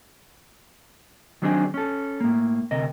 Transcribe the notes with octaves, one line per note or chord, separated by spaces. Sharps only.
D#3 F#3 C4 D4 D#4 G#4
C#4 A4
A2 A#3
D2 C3 A#4 D#5